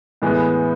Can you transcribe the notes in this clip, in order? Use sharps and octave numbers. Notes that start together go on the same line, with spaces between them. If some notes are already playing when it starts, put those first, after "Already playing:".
A2 E3 G#3 B3